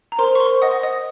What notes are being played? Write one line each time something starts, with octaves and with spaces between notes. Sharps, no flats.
A#5
A#4 C5 C6
C#6
C5 C6
D#5 F#5 D#6
D#5 D#6